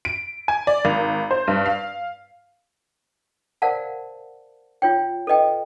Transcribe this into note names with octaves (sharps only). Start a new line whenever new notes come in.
D7
G#5
D5
G#1
C5
G2
F5
A#4 C5 D5 F5 F#5 A5
F4 C#5 G5
A4 B4 D#5 G5